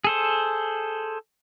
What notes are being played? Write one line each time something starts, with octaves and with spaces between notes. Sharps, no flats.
G#4 A4 C5